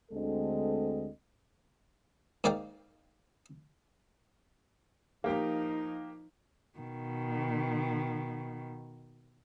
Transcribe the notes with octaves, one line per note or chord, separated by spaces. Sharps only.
D2 D3 G#3 C4 A4 D#5
G#2 A#3 D5 F5 G5
F3 A#3 D#4 G4
B2 D#3